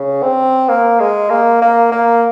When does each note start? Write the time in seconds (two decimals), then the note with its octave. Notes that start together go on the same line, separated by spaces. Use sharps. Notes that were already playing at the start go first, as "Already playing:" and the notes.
Already playing: C#3
0.23 C4
0.69 A#3
1.00 G#3
1.30 A#3
1.62 A#3
1.92 A#3